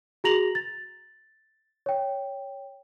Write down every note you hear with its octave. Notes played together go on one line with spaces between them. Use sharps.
F#4 G#4 A#5 A#6 F7 F#7
A6
C#5 G5